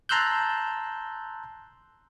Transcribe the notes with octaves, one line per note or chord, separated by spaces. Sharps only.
A5 A#5 C6 E6 F#6 G6